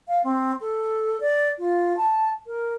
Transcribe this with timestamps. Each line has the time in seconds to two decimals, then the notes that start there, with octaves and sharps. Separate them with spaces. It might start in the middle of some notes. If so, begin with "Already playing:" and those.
0.08 F5
0.24 C4
0.61 A4
1.21 D5
1.59 F4
1.97 A5
2.47 A#4